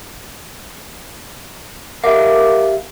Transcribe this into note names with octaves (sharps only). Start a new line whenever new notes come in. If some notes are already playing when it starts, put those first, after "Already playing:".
G4 A#4 E5 F5 D6